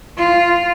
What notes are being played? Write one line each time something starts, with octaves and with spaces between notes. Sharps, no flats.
F4